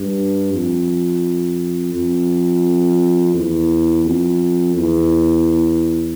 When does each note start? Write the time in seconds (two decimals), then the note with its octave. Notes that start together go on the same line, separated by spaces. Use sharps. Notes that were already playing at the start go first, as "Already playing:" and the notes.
Already playing: G2
0.54 F2
1.94 F2
3.35 E2
4.05 F2
4.75 E2